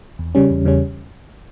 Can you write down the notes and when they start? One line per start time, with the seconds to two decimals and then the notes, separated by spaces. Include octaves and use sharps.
0.19 E2
0.35 C#3 G3 C#4
0.50 E2
0.65 C#3 G3 C#4